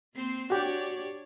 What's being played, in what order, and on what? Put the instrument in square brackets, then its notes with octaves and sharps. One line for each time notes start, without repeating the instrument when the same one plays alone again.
[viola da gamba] A#3 C4 C5
[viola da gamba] D4 C#5 D5 [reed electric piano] F#4 G4